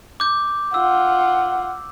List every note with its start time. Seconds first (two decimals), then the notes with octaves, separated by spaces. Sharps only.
0.20 D6 G6
0.74 F4 F#5 E6